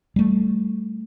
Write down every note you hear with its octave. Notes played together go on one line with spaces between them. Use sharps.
G3 A3